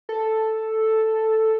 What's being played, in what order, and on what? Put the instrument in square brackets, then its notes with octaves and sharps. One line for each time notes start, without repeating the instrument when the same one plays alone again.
[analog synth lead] A4